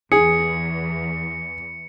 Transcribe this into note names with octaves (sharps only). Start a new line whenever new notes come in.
E2 G#4 C#7